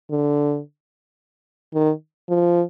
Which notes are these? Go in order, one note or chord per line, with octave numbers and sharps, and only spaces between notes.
D3
D#3
F3